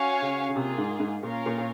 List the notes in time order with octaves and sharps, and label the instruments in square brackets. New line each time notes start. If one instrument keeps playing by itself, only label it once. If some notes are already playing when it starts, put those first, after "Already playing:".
Already playing: [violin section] C#4 F#4 C#5 F5 G#5
[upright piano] C#3
C#3
[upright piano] C3 [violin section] A#3 F4 G#4
[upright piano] G#2
G#2
[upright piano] A#2 [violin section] C#4 F4 A#4 C#5 F5
[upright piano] A#2
A#2